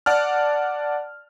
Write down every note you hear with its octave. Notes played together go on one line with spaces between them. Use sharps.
D5 F#5 A5 F6